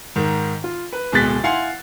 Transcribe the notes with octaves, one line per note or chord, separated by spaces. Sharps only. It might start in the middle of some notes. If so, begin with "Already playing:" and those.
G#2 D#3
F4
B4
D1 B2 G#3 F#6 A6 B6
E4 F5 F#5 G#5 C6